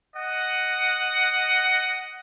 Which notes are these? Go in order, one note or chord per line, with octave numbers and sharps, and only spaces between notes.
D#5 F#5